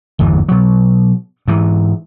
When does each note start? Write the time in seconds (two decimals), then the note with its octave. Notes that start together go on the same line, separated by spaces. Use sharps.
0.19 G1 E2 G#2 E3
0.49 B2 F#3
1.48 G#2 E3